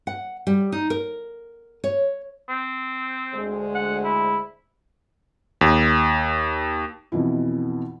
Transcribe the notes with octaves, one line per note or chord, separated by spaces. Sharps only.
F#5
G3
D#4
A#4
C#5
C4
D2 G#3 C5
F#5
E4
D#2
F2 B2 E3 E4